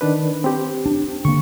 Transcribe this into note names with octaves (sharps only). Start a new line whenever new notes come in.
D#3 D4 B4
C4 G4
D4
D3 A#3 C#6